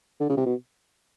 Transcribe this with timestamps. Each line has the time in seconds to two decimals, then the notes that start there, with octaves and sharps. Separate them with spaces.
0.20 D3
0.29 C#3
0.37 C3
0.46 B2